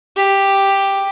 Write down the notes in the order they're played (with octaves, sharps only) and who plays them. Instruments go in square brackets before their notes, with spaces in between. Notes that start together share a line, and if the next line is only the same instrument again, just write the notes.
[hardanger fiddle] G4